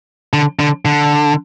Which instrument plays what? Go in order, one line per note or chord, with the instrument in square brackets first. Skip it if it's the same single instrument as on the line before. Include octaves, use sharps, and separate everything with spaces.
[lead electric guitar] D3
D3
D3